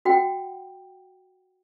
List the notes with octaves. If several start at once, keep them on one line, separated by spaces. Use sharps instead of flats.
F#4 F#5 G5